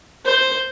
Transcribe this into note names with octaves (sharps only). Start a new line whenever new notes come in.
C5